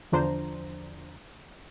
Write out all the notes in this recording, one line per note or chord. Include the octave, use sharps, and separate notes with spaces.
E2 D3 F3 D4 C5 A#5